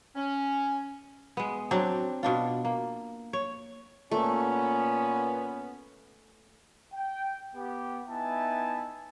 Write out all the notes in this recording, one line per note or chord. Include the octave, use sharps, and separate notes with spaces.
C#4
G#3 B3
F#3 C4 D4
B2 D4 F4
A#3
C#5
A#2 A3 B3 C#4
G5
B3 G4 G5
B3 D#4 E4 E5 G#5 A5